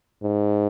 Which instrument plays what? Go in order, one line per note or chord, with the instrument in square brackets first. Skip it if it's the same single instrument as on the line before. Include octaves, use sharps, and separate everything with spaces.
[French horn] G#2